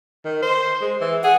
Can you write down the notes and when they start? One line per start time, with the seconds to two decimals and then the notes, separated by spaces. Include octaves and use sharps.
0.25 D#3
0.42 C5
0.81 G#3
1.01 E3
1.24 G#4 F#5